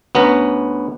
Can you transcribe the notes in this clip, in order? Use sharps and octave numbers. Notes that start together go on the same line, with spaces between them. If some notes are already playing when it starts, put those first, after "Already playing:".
D2 B3 C#4 B4 A#5